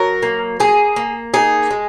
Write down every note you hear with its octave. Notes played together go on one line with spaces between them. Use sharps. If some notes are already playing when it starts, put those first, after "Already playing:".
Already playing: F#3 A#4
A#3
A#3 G#4
A#3
D#4 G#4
G#3